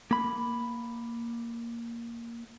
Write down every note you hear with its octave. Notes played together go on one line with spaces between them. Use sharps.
A#3 B5